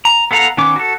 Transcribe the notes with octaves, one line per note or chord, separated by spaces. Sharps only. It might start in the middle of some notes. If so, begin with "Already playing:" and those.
A#5
B3 A4 F5 F#5 A#5
D#3 B3 C#4 D6
F#4 A4